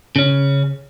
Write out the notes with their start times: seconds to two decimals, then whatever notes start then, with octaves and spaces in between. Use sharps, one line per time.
0.16 C#3 C#4